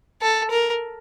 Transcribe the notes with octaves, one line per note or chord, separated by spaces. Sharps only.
A4
A#4